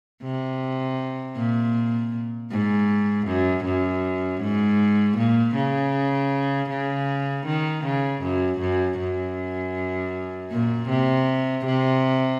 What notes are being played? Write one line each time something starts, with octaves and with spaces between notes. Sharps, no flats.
C3
A#2
G#2
F#2
F#2
G#2
A#2
C#3
C#3
D#3
C#3
F#2
F#2
F#2
A#2
C3
C3